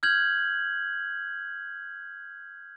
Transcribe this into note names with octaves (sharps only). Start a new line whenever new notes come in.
F6 G6 G#6 F#7